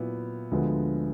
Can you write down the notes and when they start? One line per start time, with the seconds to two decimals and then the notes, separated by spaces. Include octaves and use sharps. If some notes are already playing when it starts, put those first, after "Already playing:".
Already playing: A#2 F#3 B3 E4
0.51 D2 D3 F3 G#3 B3